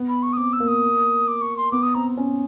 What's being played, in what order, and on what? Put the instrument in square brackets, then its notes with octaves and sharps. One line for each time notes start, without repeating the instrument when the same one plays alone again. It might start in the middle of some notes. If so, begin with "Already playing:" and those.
Already playing: [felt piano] B3
[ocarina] B5
C#6
D#6
[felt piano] C4 [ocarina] D6
[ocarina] E6
[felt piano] A#3
[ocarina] D#6
D6
C#6
C6
[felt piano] B3 [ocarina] D6
[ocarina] D#6
[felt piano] C4 [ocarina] A#5
[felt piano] C#4